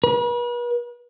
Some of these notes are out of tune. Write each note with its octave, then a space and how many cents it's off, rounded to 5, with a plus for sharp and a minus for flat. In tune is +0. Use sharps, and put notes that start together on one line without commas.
B4 -40